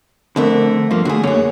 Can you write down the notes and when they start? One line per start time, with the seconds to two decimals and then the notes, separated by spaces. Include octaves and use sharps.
0.36 F2 D3 A3 A#4
0.91 G2 F3 A#3
1.05 D3 A3 F#4 G#4
1.23 F#2 D3 A#3 G#4 C#5